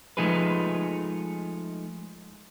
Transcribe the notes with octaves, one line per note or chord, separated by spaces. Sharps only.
F3 G#3 A3 D#4 G#4 B4